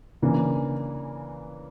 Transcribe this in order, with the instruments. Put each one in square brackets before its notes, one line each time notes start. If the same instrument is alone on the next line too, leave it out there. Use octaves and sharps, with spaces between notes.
[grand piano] C#3 E3 A#3 D4